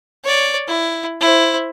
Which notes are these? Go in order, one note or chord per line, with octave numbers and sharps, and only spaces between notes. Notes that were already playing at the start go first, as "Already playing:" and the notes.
C#5 D5
E4
E4 C5